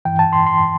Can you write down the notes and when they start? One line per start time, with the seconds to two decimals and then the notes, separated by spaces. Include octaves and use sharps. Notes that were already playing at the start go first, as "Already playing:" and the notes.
0.05 G2 E3 G5
0.19 A5
0.33 C6
0.47 C6